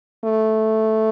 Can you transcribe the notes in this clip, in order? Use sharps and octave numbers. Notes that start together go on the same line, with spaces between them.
A3